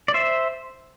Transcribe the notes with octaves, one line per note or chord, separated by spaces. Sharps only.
D5
C5 E5